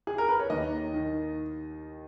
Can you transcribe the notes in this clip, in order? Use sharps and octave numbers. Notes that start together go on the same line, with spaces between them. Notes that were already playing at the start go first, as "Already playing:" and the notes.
G#4
A#4
B4
C#5
D#2 D#3 D#5
D#3